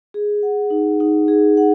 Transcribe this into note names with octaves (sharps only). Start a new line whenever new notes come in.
G#4
F#5
D#4
D#4
G#4
F#5